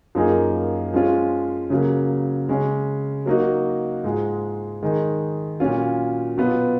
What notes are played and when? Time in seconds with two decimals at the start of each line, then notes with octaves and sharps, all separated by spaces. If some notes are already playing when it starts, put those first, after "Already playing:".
0.15 F#2 F3 A#3 D#4 G#4
0.93 F3 G#3 C#4 F4
1.70 C#3 F#3 A#3
2.49 C#3 G#3 C#4
3.26 F#3 A#3 D#4 F#4
4.04 G#2 F3 G#3
4.83 D#3 G#3 D#4
5.60 A#2 F#3 C#4 F4
6.37 B2 F#3 B3 F4